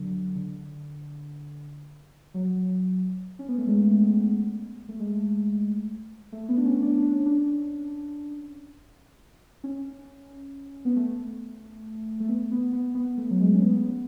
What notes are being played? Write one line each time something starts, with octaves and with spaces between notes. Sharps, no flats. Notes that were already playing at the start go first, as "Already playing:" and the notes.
Already playing: D3 F#3
D3
F#3
C#4
B3
A3
G#3
A3
G#3
A3
B3
D4
C#4
D4
D4
C#4
D4
C#4
B3
A3
A3
B3
B3
B3
B3
A3
F#3
G#3
C#4
B3